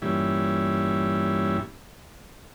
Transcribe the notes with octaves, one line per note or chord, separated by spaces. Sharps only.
G2 A#2 E3 G3 C#4 E4